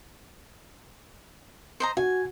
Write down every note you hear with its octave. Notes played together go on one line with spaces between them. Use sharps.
C5 D#5 A#5
F#4 G#5